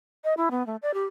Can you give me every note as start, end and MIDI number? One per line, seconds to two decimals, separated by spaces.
0.24 0.34 75
0.37 0.49 64
0.51 0.65 59
0.67 0.76 57
0.82 0.93 74
0.94 1.06 67